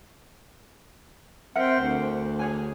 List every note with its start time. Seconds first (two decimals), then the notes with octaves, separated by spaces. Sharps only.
1.56 C4 A#4 E5 F#5
1.80 D2
2.39 G#4 C#5 G#5